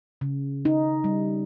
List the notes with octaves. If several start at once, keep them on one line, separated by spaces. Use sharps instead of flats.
C#3
D#4
G3